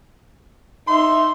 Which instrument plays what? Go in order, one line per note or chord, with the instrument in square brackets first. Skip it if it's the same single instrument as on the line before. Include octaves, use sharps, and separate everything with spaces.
[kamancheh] D#4 E5 [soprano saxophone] C6